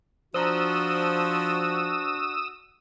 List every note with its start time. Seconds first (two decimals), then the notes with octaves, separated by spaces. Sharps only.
0.34 F3 D4 F#4 C5 A#5 D#6 E6